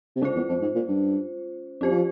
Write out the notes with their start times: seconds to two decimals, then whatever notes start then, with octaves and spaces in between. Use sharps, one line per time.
0.16 C3
0.22 C#3 G#3 C#4 F4 C5
0.35 E2
0.49 F2
0.61 G#2
0.75 A#2
0.88 G2
1.81 F2 C#4 G4 C5
1.91 F3